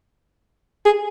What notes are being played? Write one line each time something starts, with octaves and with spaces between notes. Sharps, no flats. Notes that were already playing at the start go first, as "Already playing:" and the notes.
G#4